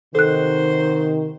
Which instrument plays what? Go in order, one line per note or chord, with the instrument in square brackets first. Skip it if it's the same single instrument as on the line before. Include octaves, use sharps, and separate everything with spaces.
[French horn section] C3 D#3 [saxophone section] F#4 C5 [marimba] A4 F#6